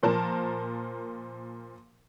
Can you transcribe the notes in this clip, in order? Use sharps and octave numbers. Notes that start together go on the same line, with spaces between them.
A#2 F3 A#4 A5